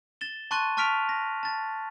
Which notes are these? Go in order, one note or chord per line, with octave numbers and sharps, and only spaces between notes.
A6 E7 G7
A5 C6 C#6 F#6 A6 D#7
A5 C#6 F6 B6 D7 F7
A#6
A5 A6